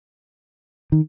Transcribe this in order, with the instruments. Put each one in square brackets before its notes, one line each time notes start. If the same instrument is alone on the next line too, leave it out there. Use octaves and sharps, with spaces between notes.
[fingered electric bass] D#3